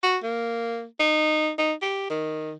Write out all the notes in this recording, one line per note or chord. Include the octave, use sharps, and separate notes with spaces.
F#4
A#3
D#4
D#4
G4
D#3